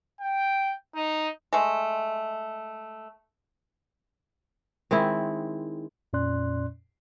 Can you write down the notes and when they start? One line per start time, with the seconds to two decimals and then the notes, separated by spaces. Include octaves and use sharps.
0.21 G5
0.95 D#4
1.53 G#3 A3
4.91 D#3 G#3 C4 E4
6.13 F2 A#2 C#4 D5 C6 F#6